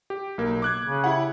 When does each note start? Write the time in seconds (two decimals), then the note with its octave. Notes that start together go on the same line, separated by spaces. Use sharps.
0.10 G4
0.38 B1 A#3
0.62 D6 F#6 G#6
0.85 C#3
1.04 E4 G4 F#5